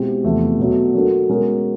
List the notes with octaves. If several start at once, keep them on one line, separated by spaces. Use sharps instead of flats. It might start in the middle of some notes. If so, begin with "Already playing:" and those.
Already playing: B2 G#3 C4 E4 G4
E2 C3 F3 A3
B2 F#3 A3
F#3 A#3 D4 F#4 A4
B2 G#3 C#4 F#4 A#4